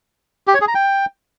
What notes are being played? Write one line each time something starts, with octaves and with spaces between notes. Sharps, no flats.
G4
C#5
G#4
A#5
G5